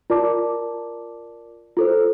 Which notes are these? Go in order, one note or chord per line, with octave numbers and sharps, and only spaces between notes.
F4 A#4 D5 A5 D6
F4 A4 C5